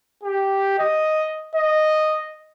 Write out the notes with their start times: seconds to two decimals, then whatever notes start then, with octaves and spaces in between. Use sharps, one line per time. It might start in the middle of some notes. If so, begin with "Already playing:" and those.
0.23 G4
0.79 D#5
1.55 D#5